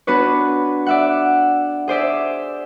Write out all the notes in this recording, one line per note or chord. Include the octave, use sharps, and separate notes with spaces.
B3 D4 F#4 B4 C#5
D5 E5 F#5
G#4 C5 D5 E5